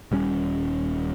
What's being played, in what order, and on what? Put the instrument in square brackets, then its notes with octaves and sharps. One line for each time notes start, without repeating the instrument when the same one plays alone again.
[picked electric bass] D#1 G3 C#4